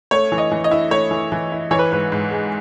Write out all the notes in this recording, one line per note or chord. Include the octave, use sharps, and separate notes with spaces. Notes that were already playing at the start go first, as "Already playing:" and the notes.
A3 C#5
E3
D#5
E3
D#5
E4
A3 C#5
E3
E3
E4
E3 C#5
B4
G#2 B4
G#2
G#3